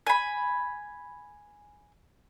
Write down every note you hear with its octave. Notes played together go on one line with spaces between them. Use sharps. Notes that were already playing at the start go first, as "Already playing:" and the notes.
G#5 B5